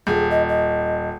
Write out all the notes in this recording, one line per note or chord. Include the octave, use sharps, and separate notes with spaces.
D#1 G#4
D#5
D#5